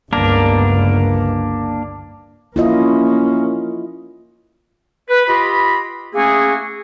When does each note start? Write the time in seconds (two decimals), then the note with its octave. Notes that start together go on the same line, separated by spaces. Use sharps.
0.13 G1 C#2 A#3 B3 D4 A#4
2.56 A#3 C#4 E4 F4 D#5
5.09 B4
5.28 F4 G4 D#5 B5
6.15 A3 A#3 C#4 E4 F#4 G#4